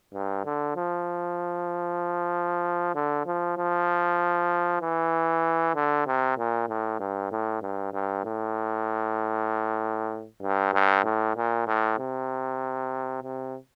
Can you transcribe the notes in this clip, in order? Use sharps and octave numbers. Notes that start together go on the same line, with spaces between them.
G2
D3
F3
D3
F3
F3
E3
D3
C3
A#2
A2
G2
A2
G2
G2
A2
G2
G2
A2
A#2
A2
C3
C3